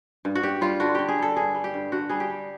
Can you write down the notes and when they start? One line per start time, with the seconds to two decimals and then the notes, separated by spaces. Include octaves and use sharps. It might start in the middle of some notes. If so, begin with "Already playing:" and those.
0.25 G2
0.35 F#4
0.43 G2 G4
0.61 G3 F4
0.80 D3 F#4
0.95 D3 G4
1.08 G#4
1.18 G3 A4
1.37 G2 G#4
1.55 G3
1.64 G4
1.74 G2
1.92 D3 F#4
2.10 G3 G#4
2.20 G4
2.30 G3